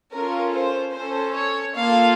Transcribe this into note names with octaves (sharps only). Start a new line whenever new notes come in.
C#4 F4 A4 A#4
C5
C#4 A4 C5
C#5
A#3 F4 A4 F5